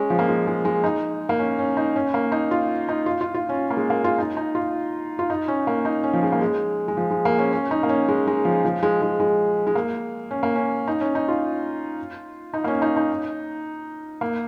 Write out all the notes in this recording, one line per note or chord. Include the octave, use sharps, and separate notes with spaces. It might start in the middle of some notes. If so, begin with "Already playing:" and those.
Already playing: G#3 C#4
F3
A#3
G#3
G#3
G#3
D#4
A#3
C#4
C#4
D#4
C#4
A#3
D#4
F4
D#4
F4
F4
F4
C#4
A#3
G#3
A#3
F4
D#4
D#4
F4
F4
D#4
C#4
A#3
D#4
C#4
F3
G#3
A#3
G#3
G#3
F3
G#3
A#3
C#4
C#4
D#4
A#3
C#4
G#3
G#3
F3
F3
G#3
G#3
G#3
G#3
A#3
C#4
A#3
C#4
D#4
C#4
D#4
F4
D#4
A#3
C#4
D#4
D#4
A#3